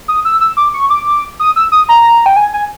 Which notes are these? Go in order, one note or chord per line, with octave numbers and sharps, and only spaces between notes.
D#6
E6
E6
D6
C#6
D6
D#6
E6
D#6
A#5
G5
G#5
G#5